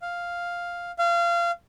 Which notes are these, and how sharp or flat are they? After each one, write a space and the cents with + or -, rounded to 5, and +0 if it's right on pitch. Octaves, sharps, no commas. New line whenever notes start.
F5 +0
F5 -25